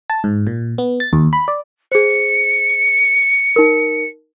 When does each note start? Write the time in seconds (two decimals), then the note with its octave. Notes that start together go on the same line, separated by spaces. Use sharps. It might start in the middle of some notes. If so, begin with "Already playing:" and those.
0.10 A5
0.24 G#2
0.47 A#2
0.78 B3
1.00 A6
1.13 D#2
1.33 B5
1.48 D5
1.92 G#4 C5 C#7
3.56 D#4 A#4